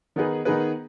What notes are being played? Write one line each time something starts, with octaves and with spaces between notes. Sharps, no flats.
D#3 B3 D#4 G#4 B4
D#3 B3 D#4 G#4 B4